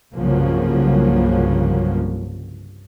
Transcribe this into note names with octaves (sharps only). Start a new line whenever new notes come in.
C2 G2 C#3 F3 F#3 A#3